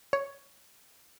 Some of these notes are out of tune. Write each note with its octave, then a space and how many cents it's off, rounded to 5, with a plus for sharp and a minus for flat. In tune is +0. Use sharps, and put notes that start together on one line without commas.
C#5 +10